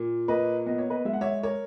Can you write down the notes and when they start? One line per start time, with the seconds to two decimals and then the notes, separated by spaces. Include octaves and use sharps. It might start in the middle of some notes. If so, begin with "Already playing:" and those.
Already playing: A#2
0.28 A#3 B4 D#5
0.66 B3 D#5
0.78 C#5
0.90 B4 D#5
1.05 G#3 E5
1.13 F#5
1.21 C#5 E5
1.43 A#4 C#5